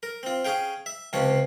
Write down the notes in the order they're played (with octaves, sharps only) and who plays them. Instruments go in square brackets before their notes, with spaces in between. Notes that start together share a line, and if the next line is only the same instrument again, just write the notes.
[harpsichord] A#4
C4 F4
C#4 G#4 F5 G5
E5
C#2 C3 F3 F4 C#5